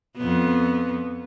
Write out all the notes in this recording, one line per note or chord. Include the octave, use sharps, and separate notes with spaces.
F2 B3